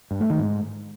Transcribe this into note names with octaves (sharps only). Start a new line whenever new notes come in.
G2
A3
D#3
G#2